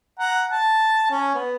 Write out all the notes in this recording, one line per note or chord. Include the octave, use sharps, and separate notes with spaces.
F#5 A#5
A5
C#4
B3